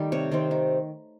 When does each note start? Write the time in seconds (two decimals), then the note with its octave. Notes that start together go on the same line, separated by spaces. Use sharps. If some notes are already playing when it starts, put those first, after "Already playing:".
Already playing: D#3 G3 A3
0.12 C3 C#5
0.31 D#3 G3 C4
0.51 D#3